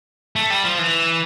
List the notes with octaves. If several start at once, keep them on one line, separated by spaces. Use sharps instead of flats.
A3
G3
F3
E3